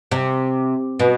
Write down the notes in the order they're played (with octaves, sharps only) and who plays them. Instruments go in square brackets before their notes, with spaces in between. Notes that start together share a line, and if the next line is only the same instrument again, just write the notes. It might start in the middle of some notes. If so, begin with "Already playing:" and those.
[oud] C3
B2